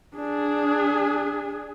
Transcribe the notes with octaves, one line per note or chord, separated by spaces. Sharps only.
D4 G#4